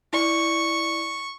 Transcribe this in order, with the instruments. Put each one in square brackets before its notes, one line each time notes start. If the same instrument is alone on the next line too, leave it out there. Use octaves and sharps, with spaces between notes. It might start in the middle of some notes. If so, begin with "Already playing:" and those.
[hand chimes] E4 D5 [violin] C#6